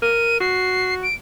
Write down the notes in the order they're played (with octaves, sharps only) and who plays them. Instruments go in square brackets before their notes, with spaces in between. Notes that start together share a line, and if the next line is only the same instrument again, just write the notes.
[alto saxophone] A#4 [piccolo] D#7
[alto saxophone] F#4 [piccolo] C7
[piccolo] D7